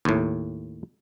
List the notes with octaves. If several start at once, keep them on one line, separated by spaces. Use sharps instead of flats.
D#2 A2